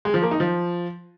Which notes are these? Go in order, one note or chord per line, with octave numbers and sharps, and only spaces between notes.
G#3
F3
A#3
D#4
F3